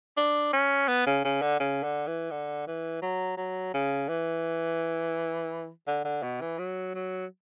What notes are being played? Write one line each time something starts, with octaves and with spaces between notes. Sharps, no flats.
D4
C#4
B3
C#3
C#3
D3
C#3
D3
E3
D3
E3
F#3
F#3
C#3
E3
D3
D3
B2
E3
F#3
F#3